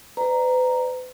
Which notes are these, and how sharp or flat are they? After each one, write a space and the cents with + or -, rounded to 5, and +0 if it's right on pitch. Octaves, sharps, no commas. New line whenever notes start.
B4 +40 D5 +10 A#5 +0